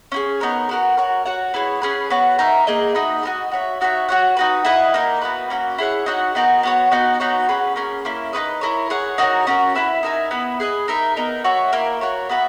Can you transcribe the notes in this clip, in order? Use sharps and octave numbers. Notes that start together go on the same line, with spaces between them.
C#4 E4 G#4
B3 D#4 A#4 C#5
B3 F#4 A#4
F#4 A#4 C#5
F#4 C#5 F#5
B3 E4 G#4 C#5
C#4 G#4 B4
B3 F#4 C#5
D#4 A#4 E5
A#3 D#4 G#4 D#5
D#4 F#4 B4 E5
F#4 A#4 D#5
F#4 C#5 E5
D#4 F#4 C#5 E5
F#4 C#5 F#5
D#4 F#4 B4
E4 B4 D#5 F#5
A#3 D#4 A#4
B3 F#4 B4
A#3 C#4 F#4
E4 G#4 C#5 F#5
D#4 F#4 C#5 F#5
B3 D#4 F#4 A#4
B3 F#4 C#5
B3 D#4 F#4
B3 D#4 F#4 C#5
C#4 G#4 B4
A#3 C#4 G#4
A#3 C#4 E4
D#4 F#4 B4 D#5
E4 A#4 C#5
G#4 C#5 F#5
D#4 F#4 A#4 C#5
C#4 F#4 A#4
E4 B4 E5 G#5
D#4 A#4 E5 G#5
B3 E4 B4
G#4 B4 D#5
D#4 A#4 E5
B3 D#4 A#4
F#4 C#5 E5
A#3 E4 A#4
F#4 A#4 C#5
B3 F#4 B4 E5